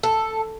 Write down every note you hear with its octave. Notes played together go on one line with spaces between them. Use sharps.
A4